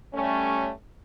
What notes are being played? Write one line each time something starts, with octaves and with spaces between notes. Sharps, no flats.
G3 A3 C#4